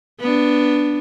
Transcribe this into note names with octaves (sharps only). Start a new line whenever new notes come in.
B3 D4